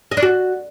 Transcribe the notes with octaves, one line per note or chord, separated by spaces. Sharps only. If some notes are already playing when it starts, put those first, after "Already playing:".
D#5
D4
F#4